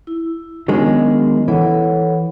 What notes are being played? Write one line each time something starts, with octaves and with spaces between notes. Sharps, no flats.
E4
D#3 F#3 G#3 B3 C#4 D4
E3 A4 C#5 F#5